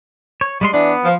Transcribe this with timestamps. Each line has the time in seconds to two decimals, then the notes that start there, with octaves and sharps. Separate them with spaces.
0.41 C#5
0.61 G3 G#3 C6
0.74 E3 B3 D4
1.05 F3